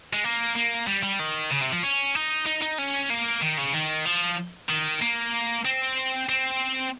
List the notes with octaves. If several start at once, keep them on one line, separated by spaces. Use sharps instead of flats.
G#3
A#3
A#3
G3
G3
D#3
C#3
C3
F3
C#4
D#4
D#4
D#4
C#4
A#3
D#3
C#3
D#3
F3
D#3
A#3
C4
C4